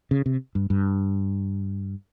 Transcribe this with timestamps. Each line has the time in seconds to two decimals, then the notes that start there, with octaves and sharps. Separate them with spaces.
0.11 C#3
0.26 C3
0.55 G2
0.70 G2